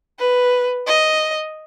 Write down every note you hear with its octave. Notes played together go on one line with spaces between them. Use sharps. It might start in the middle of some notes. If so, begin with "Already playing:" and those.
B4
D#5